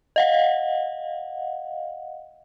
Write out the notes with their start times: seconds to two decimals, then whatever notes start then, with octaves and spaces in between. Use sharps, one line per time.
0.16 D#5 F5 F#5